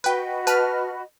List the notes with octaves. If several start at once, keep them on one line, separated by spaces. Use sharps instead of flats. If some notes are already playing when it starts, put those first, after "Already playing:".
F#4 B4 D#5 G5 B5
B4 A5 F6